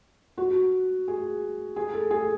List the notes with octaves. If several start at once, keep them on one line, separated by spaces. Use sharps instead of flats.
F#4
G#4
G#4
A4
G#4